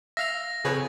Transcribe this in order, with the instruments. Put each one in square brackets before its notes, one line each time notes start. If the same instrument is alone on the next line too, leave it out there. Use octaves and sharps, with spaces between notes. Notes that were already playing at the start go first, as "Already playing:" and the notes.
[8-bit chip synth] E5 F5 F6 [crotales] A#6
[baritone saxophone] F2 [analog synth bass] C#3 [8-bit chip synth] G#4 B4 C#5